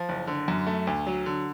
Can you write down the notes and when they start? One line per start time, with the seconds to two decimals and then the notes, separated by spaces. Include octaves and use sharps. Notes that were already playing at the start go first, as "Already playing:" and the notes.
Already playing: F3
0.09 F#1
0.27 D3
0.48 F#2
0.67 A3
0.87 D2
1.07 F#3
1.26 D3